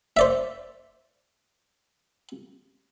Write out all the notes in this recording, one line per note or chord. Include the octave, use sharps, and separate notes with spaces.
C5 D5 E5